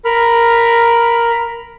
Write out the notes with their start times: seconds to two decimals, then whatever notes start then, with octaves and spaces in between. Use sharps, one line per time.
0.05 A#4 B5 F6